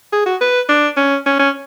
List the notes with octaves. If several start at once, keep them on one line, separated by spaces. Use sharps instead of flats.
G#4
F#4
B4
D4
C#4
C#4
C#4